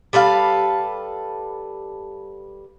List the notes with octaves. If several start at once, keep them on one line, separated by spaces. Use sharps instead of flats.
G3 A4 B4 F5